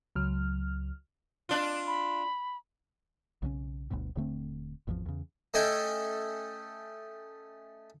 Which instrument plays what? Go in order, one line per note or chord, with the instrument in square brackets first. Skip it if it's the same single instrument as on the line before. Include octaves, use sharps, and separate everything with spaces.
[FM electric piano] C#2 F#3 F6
[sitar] D4 F4
[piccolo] B5
[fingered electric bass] B1 C#3 E3 C#4
G1 D2 G2 B2
D#1 D3 A3 C4
G#1 E2 E3 F3
E2 C#3
[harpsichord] A3 C#4 A4 D#5 G5 G#5